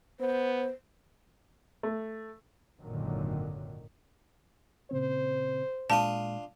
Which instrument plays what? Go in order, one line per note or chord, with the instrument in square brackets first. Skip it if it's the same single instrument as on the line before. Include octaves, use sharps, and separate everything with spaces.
[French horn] B3 [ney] C5
[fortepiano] A3
[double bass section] G#1 F#2 A#2 D3 D#3 F#3
[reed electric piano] A#2 C#3 C4 [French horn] C5
[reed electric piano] A#2 G#3 [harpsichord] D4 F4 D#6 [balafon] A5